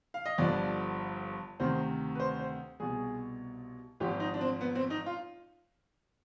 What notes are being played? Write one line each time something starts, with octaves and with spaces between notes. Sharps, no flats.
F5
D#5
G1 G2 D3 F3 D5
D2 C3 D#3 C5
B4
C5
C5
C2 B2 G#4
G#1 G#2 F3 G4
D#4
D4
C4
B3
C4
D#4
F4